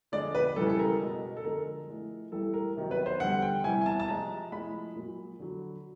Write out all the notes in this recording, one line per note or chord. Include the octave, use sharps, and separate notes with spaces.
D3 F3 G#3 D5
B4
C#3 E3 G3 A4
A4
A#4
B2 G#3
A4
D3 F3 G#3 A#4
A2 F3 G#3
A2 E3 G3 A4
A#4
C3 D#3 F#3
B4
C5
D3 G3 F#5
G5
C3 E3 G3 G#5
G#5
A5
A5
C3 F3 G#3 A#5
A2 F3 G#3 B5
A#2 F#3
D3 F#3